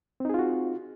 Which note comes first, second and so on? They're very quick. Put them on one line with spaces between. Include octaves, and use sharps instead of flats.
C4 D#4 G#4 F4 F#4